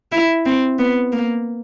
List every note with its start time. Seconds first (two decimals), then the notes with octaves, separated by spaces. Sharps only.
0.12 E4
0.46 C4
0.79 B3
1.12 A#3